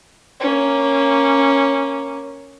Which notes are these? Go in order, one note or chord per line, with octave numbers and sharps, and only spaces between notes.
A#3 C#4